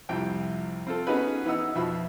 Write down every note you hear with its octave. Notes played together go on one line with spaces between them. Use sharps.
C2 F2 C3 G5
C4 F4 A4
B3 C#4 D#4 F#4 G#4 B4
E3 B3 D#4 F#5 E6
F2 B2 F3 E5 B5